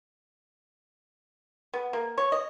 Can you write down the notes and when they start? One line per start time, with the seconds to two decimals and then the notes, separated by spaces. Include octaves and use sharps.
1.74 B3
1.93 A#3
2.18 C#5
2.32 D#5